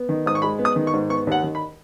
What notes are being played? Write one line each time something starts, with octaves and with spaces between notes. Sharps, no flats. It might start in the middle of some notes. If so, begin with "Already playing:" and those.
Already playing: B3
D#3
G#2 D#6
C#6
G#3 B5
B3
D#6
D#3
C#6
G#2
B3 C#6
D#2 F#5
D#3
B5